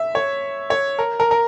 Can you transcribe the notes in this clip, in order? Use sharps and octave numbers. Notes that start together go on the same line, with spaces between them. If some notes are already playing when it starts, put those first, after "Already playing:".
Already playing: E5
C#5
C#5
A#4
A#4
A#4